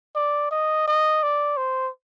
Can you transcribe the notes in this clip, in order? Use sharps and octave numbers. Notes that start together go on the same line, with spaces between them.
D5
D#5
D#5
D5
C5